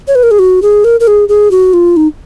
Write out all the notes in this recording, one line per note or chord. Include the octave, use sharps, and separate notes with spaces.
C#5
B4
A#4
G#4
F#4
G#4
A#4
A#4
G#4
G#4
F#4
F4
D#4